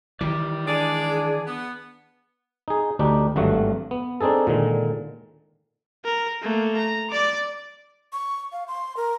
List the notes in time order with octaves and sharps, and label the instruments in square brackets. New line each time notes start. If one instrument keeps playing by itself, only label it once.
[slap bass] D#3 E3 [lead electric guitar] G4 D5
[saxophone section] G#3 D5 [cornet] D4 [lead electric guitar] G#4
[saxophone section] B3
[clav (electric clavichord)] D#4 G#4
D2 D4 D#4 G4
G#1 G2 F#3 A3 F#4
B3
C4 D4 D#4 G#4 A4
A#2 D3 D#3 G#3
[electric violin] A#4
A3 A#3
A#5
D5 D6
[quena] C#6
F5
C6
A#4